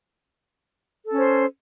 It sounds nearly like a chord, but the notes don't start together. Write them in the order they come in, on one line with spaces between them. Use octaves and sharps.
A4 C#4 C5